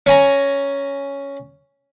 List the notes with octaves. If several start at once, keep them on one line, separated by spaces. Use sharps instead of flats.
C#4 G#5 A#5